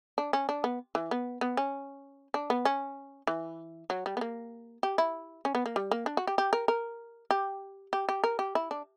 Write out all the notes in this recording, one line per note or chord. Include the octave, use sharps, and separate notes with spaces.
D4
C#4
D4
B3
E3
B3
B3
C#4
D4
B3
C#4
E3
F#3
G3
B3
A#3
G4
E4
C#4
B3
A#3
G3
A#3
D4
F#4
G4
G4
A#4
A#4
G4
G4
G4
A#4
G4
E4
D4